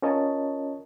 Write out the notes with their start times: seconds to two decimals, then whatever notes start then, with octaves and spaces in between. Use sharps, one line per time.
0.02 C#4 F4 A#4 C#5 D#5 A5